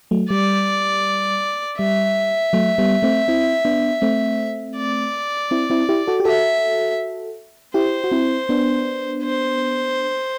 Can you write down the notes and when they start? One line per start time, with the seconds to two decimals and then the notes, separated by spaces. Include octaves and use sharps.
0.11 F#3 A3
0.31 G3 D5
1.79 G3 E5
2.53 F#3 A3
2.78 G3 B3
3.03 A3 C4
3.28 C4 E4
3.65 B3 D4
4.02 A3 C4
4.77 D5
5.51 C4 E4
5.70 C4 E4
5.89 E4 G4
6.07 F#4 A4
6.20 G4
6.25 F#4 A4 E5
7.74 E4 G4 C5
8.04 F#4
8.12 C4 E4
8.49 B3 D4
9.24 C5